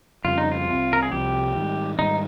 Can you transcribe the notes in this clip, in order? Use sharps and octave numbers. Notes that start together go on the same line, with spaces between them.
F2 C#3 G3 F4
D#4
F4
C2 C3 F3 C4
A#4
G#4
C2 C3 F3 C4 G4
G#2 D#3 G3
G#2 D#3 G3 D#4